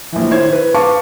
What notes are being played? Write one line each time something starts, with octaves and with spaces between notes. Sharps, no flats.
A#1 E3
D#3 E4 C5 C#5 G#6
B4
B4 F5 A5 C#6 D6